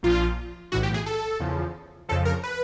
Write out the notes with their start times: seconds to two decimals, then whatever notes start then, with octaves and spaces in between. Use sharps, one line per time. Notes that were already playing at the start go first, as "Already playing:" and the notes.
0.03 A#1 A#2 F3 F4
0.72 B1 A2 E3 F#4
0.83 G4
0.94 G#4
1.06 A4
1.40 E2 C#3 F3
2.09 F2 C#3 F3 A4
2.25 A#4
2.43 B4